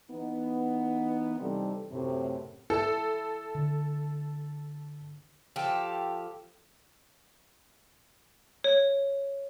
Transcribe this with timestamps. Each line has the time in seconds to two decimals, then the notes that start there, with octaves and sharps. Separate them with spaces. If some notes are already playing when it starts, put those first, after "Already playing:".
0.11 E3 B3 D#4
1.40 C3 E3 G3 C4 D#4 A4
1.92 F#2 A2 C3
2.70 E4 A4
3.55 D3
5.56 F3 G4 A4
8.64 C#5